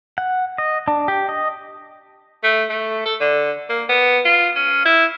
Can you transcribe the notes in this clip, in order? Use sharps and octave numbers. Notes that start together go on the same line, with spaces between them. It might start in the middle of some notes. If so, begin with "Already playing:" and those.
F#5
D#5
D4
G4
D#5
A3
A3
A4
D3
A#3
B3
F4
C#4
E4